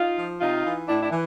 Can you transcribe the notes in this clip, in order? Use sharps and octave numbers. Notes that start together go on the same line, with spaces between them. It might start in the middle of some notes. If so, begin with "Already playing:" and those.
Already playing: D#4 F4
F3
C3 D#4 F4
E3
A2 D4 E4
D4 E4
E3